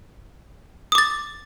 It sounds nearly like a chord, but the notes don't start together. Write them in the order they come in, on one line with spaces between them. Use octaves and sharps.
D#6 D6 A6